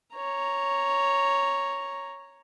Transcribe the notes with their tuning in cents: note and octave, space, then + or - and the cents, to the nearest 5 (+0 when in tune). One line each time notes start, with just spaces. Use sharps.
C#5 +0 A#5 +0